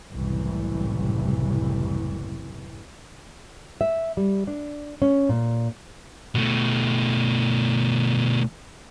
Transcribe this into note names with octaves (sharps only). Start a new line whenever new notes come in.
F#1 C2 A2 C3 E3
E5
G3
D4
C#4
A#2
B2 A3